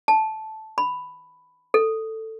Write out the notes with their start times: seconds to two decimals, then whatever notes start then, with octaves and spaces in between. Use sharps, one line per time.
0.08 A5
0.78 B5
1.74 A4